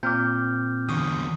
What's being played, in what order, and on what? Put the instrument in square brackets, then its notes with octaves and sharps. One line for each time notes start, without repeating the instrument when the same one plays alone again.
[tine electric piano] A#2 C4 [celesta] D6 F6 G6
[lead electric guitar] E2 D3 [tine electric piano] C#6 D#6